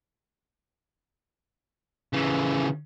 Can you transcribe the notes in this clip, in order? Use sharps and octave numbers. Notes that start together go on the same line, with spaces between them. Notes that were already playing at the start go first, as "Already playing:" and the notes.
C#3 E3